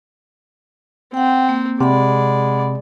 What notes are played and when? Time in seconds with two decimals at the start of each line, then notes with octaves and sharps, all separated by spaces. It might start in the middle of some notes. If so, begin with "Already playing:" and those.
1.14 C4 F#5 G5
1.49 A#3
1.81 C3 G#3 D5 F#5 B5